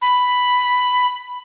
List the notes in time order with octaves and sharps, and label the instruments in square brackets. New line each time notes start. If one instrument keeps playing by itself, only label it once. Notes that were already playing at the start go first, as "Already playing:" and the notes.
[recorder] B5